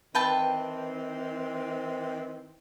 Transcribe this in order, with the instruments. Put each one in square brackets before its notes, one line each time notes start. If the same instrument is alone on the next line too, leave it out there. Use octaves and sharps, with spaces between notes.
[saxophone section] D#3 E3 C4 [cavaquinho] B4 G5 A5